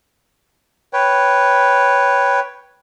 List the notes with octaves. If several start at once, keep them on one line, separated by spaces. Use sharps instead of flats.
B4 C#5 G5